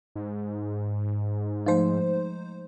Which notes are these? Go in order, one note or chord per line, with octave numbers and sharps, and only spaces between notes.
G#2
F3 G#3 A3 D#4 C5